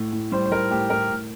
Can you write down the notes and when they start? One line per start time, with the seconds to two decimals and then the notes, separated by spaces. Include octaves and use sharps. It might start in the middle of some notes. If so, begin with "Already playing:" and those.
Already playing: A2
0.12 A2
0.32 G3 C5
0.46 C5
0.51 G3 A#4
0.71 A2 G4
0.90 A2 A#4
1.10 A2